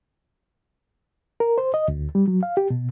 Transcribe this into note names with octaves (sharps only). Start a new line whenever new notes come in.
A#4
C5
D#5
D2
G3
F#3
F5
G4
B2